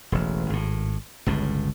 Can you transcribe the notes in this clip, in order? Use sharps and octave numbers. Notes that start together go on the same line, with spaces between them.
E1 A1
G#1 A2
G1 C#2 A2